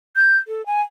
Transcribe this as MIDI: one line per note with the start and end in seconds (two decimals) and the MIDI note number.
0.16 0.37 91
0.48 0.65 69
0.66 0.81 80